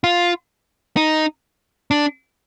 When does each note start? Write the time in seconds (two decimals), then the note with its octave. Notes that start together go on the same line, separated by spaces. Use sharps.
0.04 F4
0.97 D#4
1.91 D4